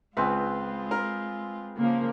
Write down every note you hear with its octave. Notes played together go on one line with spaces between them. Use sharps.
C#2 G#3 C4 F4 G#4 B4
A#4
C#3 F3 A#3